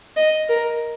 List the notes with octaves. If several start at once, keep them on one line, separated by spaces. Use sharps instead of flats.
D#5
A#4